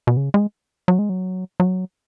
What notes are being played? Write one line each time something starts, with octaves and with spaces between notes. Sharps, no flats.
B2
C#3
G#3
F#3
G#3
F#3
F#3